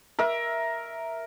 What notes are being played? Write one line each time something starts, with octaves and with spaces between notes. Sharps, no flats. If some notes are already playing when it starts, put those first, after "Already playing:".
A#4 E5